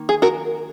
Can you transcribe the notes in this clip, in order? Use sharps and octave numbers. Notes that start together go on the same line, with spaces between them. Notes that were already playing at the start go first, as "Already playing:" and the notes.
Already playing: D#3 A#3
G#4
F#4 A#4